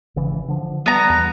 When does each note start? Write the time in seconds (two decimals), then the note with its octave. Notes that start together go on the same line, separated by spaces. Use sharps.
0.16 G#1 C#3 E3
0.48 D3 F3
0.86 G3 B3 A#5
1.09 E2